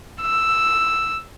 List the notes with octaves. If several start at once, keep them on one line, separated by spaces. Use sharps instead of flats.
E6